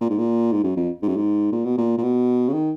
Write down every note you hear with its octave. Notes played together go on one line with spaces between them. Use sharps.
A#2
G#2
A#2
G#2
F#2
F2
G#2
F#2
G#2
A#2
B2
A#2
A#2
B2
C#3
D#3